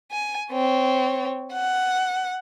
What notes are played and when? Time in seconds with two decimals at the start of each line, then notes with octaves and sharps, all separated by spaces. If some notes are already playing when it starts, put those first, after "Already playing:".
0.12 G#5
0.52 C4 C#5
1.53 F#5